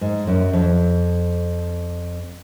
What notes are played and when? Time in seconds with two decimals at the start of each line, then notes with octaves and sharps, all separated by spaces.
0.01 G#2
0.27 F#2
0.53 F2